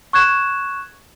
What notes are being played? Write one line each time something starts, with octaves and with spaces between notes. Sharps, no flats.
C#6 F#6 G#6 E7